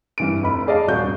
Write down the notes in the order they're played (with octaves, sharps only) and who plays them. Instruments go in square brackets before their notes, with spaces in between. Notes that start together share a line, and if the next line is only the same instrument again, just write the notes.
[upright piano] G2 E3 D7
F1 B5
G#4 D5 D#5 F5 A5
D#1 F#4 G6
G2